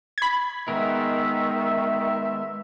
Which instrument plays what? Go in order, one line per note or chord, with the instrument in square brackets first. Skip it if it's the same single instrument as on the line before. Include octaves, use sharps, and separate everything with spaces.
[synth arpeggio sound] B5 G#6
[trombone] D#3 [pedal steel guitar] G#3 B3 A#4 [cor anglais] E5